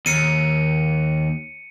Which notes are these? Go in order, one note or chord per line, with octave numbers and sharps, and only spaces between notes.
D#2 C#7 D#7